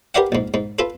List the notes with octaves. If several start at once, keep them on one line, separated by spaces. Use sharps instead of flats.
G4 A#4 B4 D5 F5 F#5
A#1 G#2
G#2
F4 A4 B4